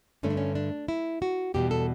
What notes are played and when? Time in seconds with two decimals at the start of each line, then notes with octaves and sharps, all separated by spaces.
0.23 G2 D3 A3 C#4
0.30 D4
0.37 C#4
0.55 D4
0.88 E4
1.22 F#4
1.54 E2 B2 G3 G4
1.71 A4